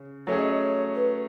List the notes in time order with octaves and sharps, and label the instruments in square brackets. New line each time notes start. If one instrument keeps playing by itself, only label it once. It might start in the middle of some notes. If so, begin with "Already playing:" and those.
Already playing: [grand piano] C#3
[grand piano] F#3 A3 C#4 G#4 [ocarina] C#5
[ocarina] D#5
C#5
B4